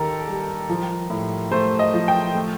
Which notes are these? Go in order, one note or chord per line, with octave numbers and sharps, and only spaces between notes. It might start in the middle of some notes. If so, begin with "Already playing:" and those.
Already playing: D#2 D#3 G4 A4 A#4
G3
F3
A2
A3 C5
D#5
F3
G5
A3